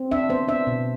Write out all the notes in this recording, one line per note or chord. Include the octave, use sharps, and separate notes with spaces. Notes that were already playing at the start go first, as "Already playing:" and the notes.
Already playing: C4
D4 E5
B3 C5
D4 E5
B2